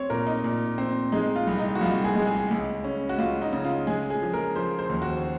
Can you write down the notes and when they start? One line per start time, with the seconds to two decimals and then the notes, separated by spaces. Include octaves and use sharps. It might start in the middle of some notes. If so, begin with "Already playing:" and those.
Already playing: C4 C#5
0.10 A#2 A#4
0.26 D#4
0.44 A#2
0.78 C4
1.12 G#3 D#4
1.36 F4
1.47 C2
1.59 D#4
1.75 F#4
1.81 C2 F4
2.04 G#4
2.16 G#3
2.27 G#4
2.51 C#2
2.84 C#4
3.09 F#4
3.18 C#2 F4
3.41 D#4
3.53 C#3
3.65 F4
3.87 G#3 G#4
4.10 G#4
4.22 F3
4.34 A#4
4.56 F3 C5
4.79 C5
4.90 D#2
5.02 F#4